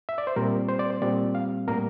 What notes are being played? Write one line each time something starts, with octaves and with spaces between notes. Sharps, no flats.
E5
D5
C5
A#2 G3 C4 A#4
C5
D5
C5
A#2 G3 C4 D5
F5
A2 G3 A#3 A#4